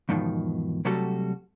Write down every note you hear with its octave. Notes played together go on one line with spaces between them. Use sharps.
E2 G#2 B2 D#3 F3
C3 F#3 G3 A3 F#4 A4